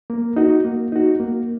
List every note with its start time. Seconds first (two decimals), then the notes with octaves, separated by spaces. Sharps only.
0.10 A#3
0.36 D#4 F#4
0.65 A#3
0.92 D#4 F#4
1.20 A#3